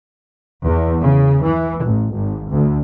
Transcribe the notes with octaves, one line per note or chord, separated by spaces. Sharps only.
E2
C#3
E3
A1
G#1
D2